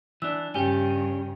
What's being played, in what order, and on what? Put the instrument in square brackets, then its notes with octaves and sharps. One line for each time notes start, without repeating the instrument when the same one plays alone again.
[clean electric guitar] E3 D4 [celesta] E6
[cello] G2 C#3 [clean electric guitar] C#4 G4 [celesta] G5 G#5